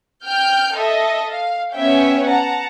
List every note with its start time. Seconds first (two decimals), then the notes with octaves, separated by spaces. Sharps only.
0.24 G5 F6 G6
0.74 A4 D#5 E5
1.28 F5
1.73 B3 C#4 C#5 E5 G5
2.24 F#5 A5 A#5